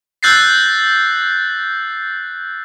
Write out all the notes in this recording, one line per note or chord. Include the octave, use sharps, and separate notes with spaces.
E6 F#6 G6 A6 A#6 C7